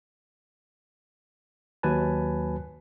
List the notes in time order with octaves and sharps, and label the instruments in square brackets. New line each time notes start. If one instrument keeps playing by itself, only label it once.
[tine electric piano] D#2 F#3 B4 G#5 A5